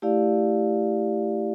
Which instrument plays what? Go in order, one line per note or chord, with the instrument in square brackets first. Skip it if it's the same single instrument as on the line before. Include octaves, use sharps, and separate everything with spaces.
[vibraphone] A3 E4 G4 D5 F5